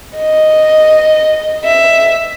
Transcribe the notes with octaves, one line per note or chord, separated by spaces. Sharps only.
D#5
E5